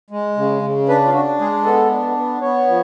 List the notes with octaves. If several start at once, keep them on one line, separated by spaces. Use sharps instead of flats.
G#3
C#3
C#3
D4 B4
F4
D4 F#4
G#3 G#4
B3 A4
D4
B3
B3 C#5
F3